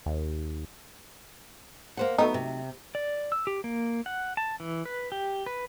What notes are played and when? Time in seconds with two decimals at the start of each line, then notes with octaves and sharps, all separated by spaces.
0.06 D#2
1.97 A#3 C5 F#5
2.18 F#3 A3 B3 D#4
2.34 C3
2.95 D5
3.32 E6
3.47 G4
3.64 A#3
4.06 F#5
4.37 A5
4.60 E3
4.85 B4
5.12 G4
5.46 B4